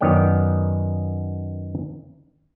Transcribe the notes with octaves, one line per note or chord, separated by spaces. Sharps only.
F#2 D#3 B3 C#5 D5 G5